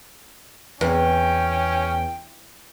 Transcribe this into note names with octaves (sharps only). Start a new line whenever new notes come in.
E2 C#4 G5